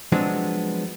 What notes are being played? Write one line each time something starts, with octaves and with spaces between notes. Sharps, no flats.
F3 F#3 G#3 B3 C4 D4